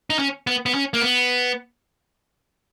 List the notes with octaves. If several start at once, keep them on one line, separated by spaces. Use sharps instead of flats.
D#4
C#4
B3
B3
C#4
A#3
B3